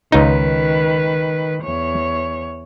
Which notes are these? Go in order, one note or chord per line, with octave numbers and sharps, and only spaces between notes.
C#2 D#3 D#4 B4
E2 C#5